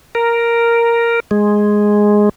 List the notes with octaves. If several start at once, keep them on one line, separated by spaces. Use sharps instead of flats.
A#4
G#3